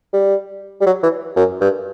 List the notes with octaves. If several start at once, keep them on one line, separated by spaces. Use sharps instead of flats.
G3
G3
F#3
E3
F#2
G2